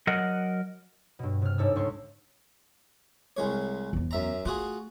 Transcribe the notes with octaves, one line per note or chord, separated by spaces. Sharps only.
F#3 A#4 D#5 F#5
G2 B2
C3 F6
G#2 D4 A4 C#5 E6
C#2 C6 C#6
C2 G#3 C#5
E2 B3
F#2 E5 A#5
A3 F4 F#4 G#4